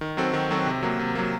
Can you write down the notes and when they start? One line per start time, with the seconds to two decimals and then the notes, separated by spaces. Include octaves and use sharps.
0.01 D#3
0.17 F#3 C4 F#4 A4
0.33 D#3
0.51 F#3 C4 F#4 A4
0.66 C3
0.83 F#3 A#3
0.99 C3
1.15 F#3 A#3